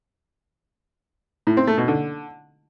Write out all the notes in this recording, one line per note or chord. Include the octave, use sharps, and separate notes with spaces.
A2
C4
A3
B2
D3